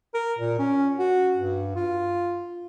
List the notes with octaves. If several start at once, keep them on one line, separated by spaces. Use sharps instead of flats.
A#4
A#2
C#4
F#4
G2
F4